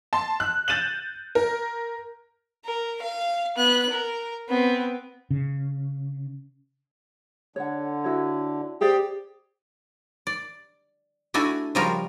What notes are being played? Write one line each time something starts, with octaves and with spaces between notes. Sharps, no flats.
A5 C6
F#6
G6 A6 D#7 E7 F#7
A#4
A#4
F5
B3 F#6
A#4
B3 C4
C#3
D3 C#5 F#5
E4 F#4 C#5
G4 G#4 C5 D5
D5
A3 D4 E4 F#4 G#5
C#3 F3 G3 F4 F#4 A#4